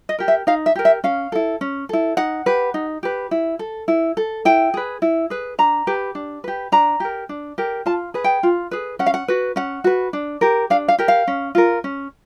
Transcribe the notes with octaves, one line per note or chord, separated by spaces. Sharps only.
D#5
G4 A#4
E5
D#4 F5
E5
G4 A#4
E5
C#4 F5
E4 A4
C#4
E4 A4
D#4 F#5
G4 B4
D#4
G4 B4
E4
A4
E4
A4
E4 G5
G#4 B4
E4
G#4 B4
D4 A#5
G4 B4
D4
G4 B4
D4 A#5
G4 A#4
D4
G4 A#4
F4 A5
G#4 B4
G5
F4
G#4 B4
C#4 F#5
F5
F#5
F#4 B4
C#4 F#5
F#4 B4
D4
G4 A#4
D4 F5
F5
G4 A#4
F5
C#4
F4 A#4
C#4